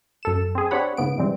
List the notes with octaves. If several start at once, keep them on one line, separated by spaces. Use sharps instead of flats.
F#2 A4 E7
C4 G#4
C4 D4 G4 C#5 F#5 B5
G#2 C#3 B3 D7
G#2 B2 E3 G3 C4